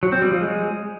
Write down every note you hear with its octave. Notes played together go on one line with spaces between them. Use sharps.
F#3
C4
G3
F3
G#3